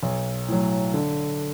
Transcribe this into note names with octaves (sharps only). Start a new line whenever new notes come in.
B1
A2 F#3
D3